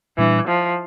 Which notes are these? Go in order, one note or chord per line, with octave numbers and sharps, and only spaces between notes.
A#2 E3 G3 D4
F3